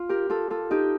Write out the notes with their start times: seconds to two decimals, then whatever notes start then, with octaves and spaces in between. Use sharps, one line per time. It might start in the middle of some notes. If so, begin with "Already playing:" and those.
Already playing: F4
0.09 G4 A#4
0.30 F4 A4
0.50 F4 A4
0.71 D#4 G4